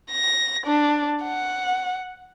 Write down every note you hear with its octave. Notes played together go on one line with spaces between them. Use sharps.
A#6
D4
F#5